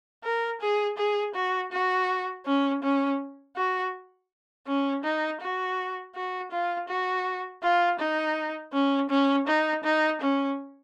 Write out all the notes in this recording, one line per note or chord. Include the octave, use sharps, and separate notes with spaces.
A#4
G#4
G#4
F#4
F#4
C#4
C#4
F#4
C#4
D#4
F#4
F#4
F4
F#4
F4
D#4
C#4
C#4
D#4
D#4
C#4